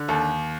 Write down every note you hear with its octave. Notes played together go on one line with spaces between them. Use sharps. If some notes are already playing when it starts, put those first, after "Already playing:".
Already playing: D3
D#2 A4